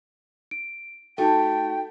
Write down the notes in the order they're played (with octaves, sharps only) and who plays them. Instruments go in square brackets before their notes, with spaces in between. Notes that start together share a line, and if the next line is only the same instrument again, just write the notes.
[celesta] D7
[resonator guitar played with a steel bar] A3 [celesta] D#4 F#4 A4 [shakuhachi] G5